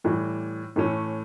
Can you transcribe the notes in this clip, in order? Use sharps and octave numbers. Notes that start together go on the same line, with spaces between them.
A2 E3 G3
A2 E3 A3 C#4